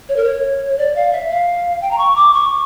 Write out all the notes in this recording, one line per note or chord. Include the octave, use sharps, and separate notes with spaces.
C#5
A#4
C#5
D5
F5
E5
F5
G5
A#5
C#6
D6
C#6